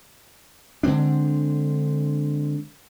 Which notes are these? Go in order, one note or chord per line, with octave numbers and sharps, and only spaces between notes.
D3 G#3 C4 D4